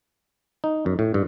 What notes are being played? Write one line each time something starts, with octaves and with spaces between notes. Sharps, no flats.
D#4
F#2
A2
G2